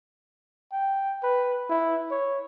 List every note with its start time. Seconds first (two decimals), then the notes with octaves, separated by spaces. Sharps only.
0.72 G5
1.23 B4
1.70 E4
2.11 C#5